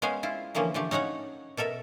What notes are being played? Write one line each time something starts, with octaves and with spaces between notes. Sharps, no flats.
G#3 B3 C#4 G#4 C5 F5
E4 F4
D3 E3 F3 A#3 C#4
D3 F3 A3 G4
C#4 D#4 F#4 C#5 F#5
B2 A4 A#4 E5